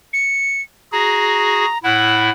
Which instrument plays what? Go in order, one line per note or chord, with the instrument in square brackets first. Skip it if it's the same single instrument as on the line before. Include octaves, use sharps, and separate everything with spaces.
[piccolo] C#7
[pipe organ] F#4 G#4 [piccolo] A#5
[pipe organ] A2 E4 [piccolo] F#5